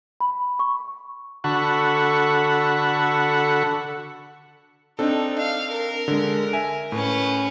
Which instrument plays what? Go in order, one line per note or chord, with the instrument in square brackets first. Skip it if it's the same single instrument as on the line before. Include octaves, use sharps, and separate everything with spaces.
[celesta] B5
C#6
[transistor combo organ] D3 F#4 A4 F#5 B5 C#6
[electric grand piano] C4 D4 A4 [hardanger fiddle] D#4
[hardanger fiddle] F5
A#4
[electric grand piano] D3 G#3
E5 G#5
[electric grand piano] A2 [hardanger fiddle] C#4 B4